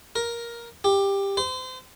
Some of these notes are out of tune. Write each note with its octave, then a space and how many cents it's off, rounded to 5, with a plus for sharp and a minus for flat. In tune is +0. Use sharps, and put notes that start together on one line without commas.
A#4 +10
G4 +15
C5 -35